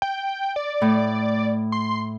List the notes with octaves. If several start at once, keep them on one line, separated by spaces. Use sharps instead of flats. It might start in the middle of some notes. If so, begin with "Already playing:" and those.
G5
D5
A2
C6